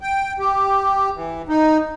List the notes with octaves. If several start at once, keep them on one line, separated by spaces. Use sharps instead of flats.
G5
G4
E3
D#4